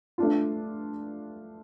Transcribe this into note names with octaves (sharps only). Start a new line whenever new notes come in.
A3 D4 F4